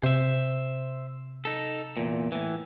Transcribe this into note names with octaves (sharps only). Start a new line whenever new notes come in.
C3 C5 E5
D#4 A4
E2 A#2
A2 E3